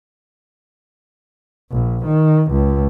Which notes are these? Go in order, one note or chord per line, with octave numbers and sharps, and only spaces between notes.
A#1
D#3
C#2